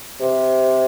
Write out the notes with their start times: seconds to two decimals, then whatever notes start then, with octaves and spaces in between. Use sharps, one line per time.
0.21 C3